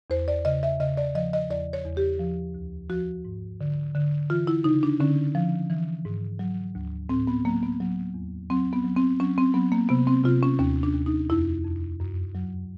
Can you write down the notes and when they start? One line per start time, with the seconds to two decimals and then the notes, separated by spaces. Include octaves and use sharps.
0.10 E2 C5
0.28 D5
0.45 C#3 D#5
0.63 E5
0.80 C#3 D#5
0.97 D5
1.15 F3 D#5
1.33 D#5
1.50 E2 D5
1.73 C#5
1.85 E2
1.97 G4
2.20 F3
2.55 D2
2.89 F3 F#4
3.25 G#2
3.61 D3
3.95 D3
4.30 E3 F4
4.47 E4
4.64 C#3 D#4
4.83 D4
5.00 D3 C#4
5.35 F3
5.70 E3
6.05 G#2
6.39 F#3
6.75 D2
7.09 A2 C4
7.27 B3
7.45 F#3 A#3
7.63 B3
7.80 F#3
8.14 E2
8.50 F#3 C4
8.73 B3
8.84 F#3
8.96 C4
9.20 F#3 C#4
9.38 C4
9.54 F#3 B3
9.72 A#3
9.89 C3 B3
10.07 C4
10.24 C3 F4
10.43 C#4
10.59 D#2 C#4
10.83 D4
10.94 D#2
11.06 D#4
11.30 F2 E4
11.64 F2
12.00 F#2
12.35 F#3